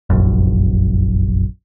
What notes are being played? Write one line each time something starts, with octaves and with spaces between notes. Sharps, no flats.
F1 A#1 F#2